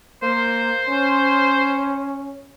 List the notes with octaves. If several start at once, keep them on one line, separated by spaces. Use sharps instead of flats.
A#3 C5
C#4